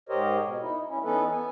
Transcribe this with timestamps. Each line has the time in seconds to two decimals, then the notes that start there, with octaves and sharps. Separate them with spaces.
0.09 G#2 G4 A#4 C5 C#5 D#5
0.43 B2
0.62 D#4 E4
0.89 G2 C#4 E4
1.04 E3 B3 C#4 D#4 A4 B4
1.32 B3 G#5